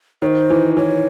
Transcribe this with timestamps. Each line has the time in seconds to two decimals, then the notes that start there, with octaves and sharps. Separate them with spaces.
0.22 D#3 C5 C#5
0.50 E3
0.77 E3 C#5